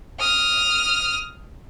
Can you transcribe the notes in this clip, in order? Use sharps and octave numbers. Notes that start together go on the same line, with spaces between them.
D#6 F6